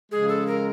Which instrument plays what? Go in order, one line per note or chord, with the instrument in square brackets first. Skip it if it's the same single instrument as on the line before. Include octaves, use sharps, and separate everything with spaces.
[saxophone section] C#3 F3 G#3 [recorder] G#4
[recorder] A4
A#4